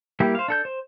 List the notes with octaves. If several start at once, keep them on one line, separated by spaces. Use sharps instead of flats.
G3 A#3 E4 G4
C5 F5
D4 A4 G6
C5